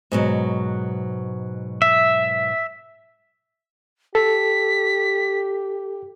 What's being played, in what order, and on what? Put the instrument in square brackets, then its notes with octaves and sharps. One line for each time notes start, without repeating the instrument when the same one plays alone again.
[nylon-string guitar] G#2 B2 F#3
[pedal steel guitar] E5
[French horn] G4 [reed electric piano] A4 [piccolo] B6